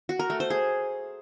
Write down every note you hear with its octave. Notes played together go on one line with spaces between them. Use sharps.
F#4
A#4
A3
C5
G#4